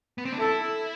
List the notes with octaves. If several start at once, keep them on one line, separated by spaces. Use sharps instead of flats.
B3
C4
D4
E4 A4